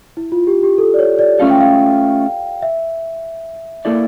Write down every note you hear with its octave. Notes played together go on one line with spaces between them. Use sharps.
E4
F4
G4
G4
A4
D5
C#5
D5
A3 C#4 F4 A4 F5
G5
F5
E5
A#3 E4 A4 D5